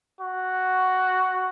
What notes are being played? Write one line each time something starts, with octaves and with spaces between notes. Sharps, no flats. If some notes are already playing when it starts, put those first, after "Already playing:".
F#4